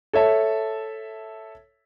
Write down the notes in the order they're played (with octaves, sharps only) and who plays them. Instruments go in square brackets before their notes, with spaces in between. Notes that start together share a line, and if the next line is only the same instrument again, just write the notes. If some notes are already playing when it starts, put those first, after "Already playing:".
[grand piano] A4 C#5 E5 A5